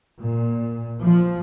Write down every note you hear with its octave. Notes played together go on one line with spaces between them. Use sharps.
A#2
F3